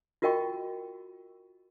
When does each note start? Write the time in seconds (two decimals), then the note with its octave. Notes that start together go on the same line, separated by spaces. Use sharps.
0.22 F4 F#4 A#4 D#5 G5 C#6